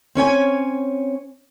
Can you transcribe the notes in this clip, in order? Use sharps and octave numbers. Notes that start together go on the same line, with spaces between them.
C4 C#4 C#5 G#5